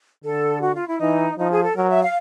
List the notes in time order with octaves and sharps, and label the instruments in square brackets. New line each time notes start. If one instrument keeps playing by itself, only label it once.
[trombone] D3 [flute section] A4
[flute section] F#4
F4
E4
[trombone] E3 [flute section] D#4
[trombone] F3 [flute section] D#4
[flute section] G#4
A4
[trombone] F#3 [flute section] A#4
[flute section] E5
F5